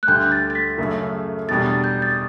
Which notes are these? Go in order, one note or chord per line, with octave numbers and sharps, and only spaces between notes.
F#6
D2 D3 G3 G6
A6
A6
B6
F#2 C#3 F#3 A3
E2 B2 G3 D4 A6
A6
G6
A6